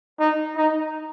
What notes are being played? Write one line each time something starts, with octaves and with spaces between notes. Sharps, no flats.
D#4
D#4